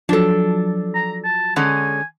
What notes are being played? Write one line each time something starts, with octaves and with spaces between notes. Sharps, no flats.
F3 F#3 D4 A4
A#5
A5
D3 G#3 C#4 G#5